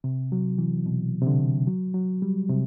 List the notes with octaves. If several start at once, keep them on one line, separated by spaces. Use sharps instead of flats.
C3
F#3
E3
B2
C3
D3
F#3
F#3
G3
C3